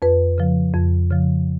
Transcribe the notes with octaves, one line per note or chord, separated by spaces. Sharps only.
F2 B4
C#3 F3
F2
C#3 F3